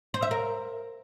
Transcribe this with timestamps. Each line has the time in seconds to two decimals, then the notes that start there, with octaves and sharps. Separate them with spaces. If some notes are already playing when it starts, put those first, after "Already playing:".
0.14 C5
0.22 E5
0.31 A#4